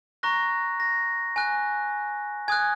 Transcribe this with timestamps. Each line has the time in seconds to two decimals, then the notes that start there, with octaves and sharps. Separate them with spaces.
0.23 A#5 C#6 F#6 A#6
0.80 A#6
1.36 G#5 F#6
2.48 G#5 D#6 F#6 G#6